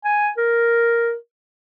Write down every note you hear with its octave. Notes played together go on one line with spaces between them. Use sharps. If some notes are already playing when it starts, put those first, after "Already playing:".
G#5
A#4